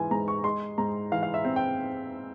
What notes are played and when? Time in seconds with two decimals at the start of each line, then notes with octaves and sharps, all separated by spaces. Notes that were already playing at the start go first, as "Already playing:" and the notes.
Already playing: G#2 E3 G#5
0.11 G#2 A#5
0.28 C#6
0.44 G#3 C6
0.78 G#2 A#5
1.12 E3 F5
1.23 F5
1.34 E5
1.45 C4
1.56 G5